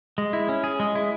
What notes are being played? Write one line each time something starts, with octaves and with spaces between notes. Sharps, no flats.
G#3
E4
C#4
G#4
G#3
E4